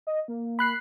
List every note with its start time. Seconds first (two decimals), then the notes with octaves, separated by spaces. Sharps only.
0.07 D#5
0.28 A#3
0.59 B5 F#6 C7